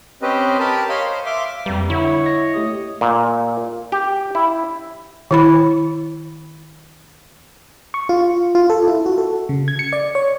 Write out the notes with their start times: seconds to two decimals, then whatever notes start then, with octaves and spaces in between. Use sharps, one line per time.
0.22 C4 C#4 G4 B4 C5 D#5
0.60 G4 A#4 A5 B5
0.89 C#5 D#5 F5 B5 C6
1.06 C5
1.26 E5 F5 C6 D6
1.66 F2 G3 A#3 B4
1.90 D3 E4 C#5 F#5
2.25 D#5 A#6 C#7
2.54 A3 G4 C#5 D#5
3.01 A#2
3.92 G4
4.35 E4
5.31 D#3 E4 B5
7.94 C#6
8.09 F4
8.55 F4
8.70 A4
8.88 E4
9.06 F#4
9.18 A4
9.49 C#3
9.68 G#6
9.79 C#7
9.93 D5
10.15 C#5